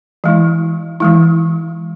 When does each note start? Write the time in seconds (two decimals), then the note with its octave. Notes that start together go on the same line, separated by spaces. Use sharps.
0.24 E3 G#3 E4
1.00 E3 G#3 E4